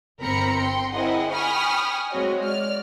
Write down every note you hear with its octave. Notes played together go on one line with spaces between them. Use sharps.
G1 C4 A#4 A#5 B5 C#7
G5 C6
C4 E4 G#4 A#4 D#5 F#5
G5 G#5 B5 C#6 D#6 F6
G#3 C4 F#4 C#5 D#5
D5 F6